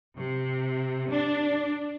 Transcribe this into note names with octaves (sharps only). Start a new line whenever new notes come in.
C3
D4